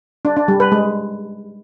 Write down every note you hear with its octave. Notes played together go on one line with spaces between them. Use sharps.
D4
D4
G3
B4
G#3